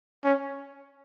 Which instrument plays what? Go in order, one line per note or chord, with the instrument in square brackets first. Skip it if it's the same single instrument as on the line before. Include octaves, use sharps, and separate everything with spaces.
[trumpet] C#4